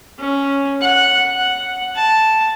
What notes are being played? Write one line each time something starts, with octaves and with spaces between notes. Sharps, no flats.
C#4
F#5
F#5
A5